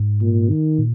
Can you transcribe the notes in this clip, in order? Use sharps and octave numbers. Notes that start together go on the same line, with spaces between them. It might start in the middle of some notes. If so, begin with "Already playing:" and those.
Already playing: G#2
A#2
D#3
A#2